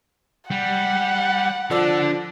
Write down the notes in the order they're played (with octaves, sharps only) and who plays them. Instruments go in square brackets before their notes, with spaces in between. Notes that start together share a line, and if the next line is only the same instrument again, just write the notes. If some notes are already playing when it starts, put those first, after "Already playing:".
[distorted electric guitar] G3 [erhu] F#5
[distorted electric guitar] D3 D4 [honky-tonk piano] F3 D5 E6